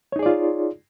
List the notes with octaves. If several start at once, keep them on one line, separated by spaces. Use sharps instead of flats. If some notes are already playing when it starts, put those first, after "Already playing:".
D#4 F4 G#4 C#5 D5